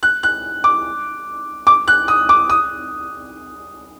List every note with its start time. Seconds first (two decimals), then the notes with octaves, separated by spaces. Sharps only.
0.03 F#6
0.23 F#6
0.64 D6
1.67 D6
1.88 F#6
2.08 D#6
2.29 D6
2.50 D#6